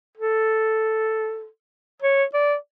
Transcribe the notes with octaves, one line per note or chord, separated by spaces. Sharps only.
A4
C#5
D5